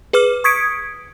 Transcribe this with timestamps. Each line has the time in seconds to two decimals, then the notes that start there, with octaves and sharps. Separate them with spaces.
0.13 G#4 B4 D6 F6
0.44 C#6 D#6 G#6 B6 C#7 D7